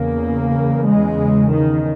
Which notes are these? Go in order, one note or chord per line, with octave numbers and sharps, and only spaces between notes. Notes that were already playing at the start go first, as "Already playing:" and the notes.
Already playing: E2 C#3 A#3
G#3
D#3